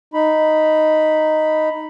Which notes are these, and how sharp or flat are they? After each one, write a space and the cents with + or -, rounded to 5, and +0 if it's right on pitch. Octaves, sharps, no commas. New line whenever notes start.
D#4 +0 B5 +0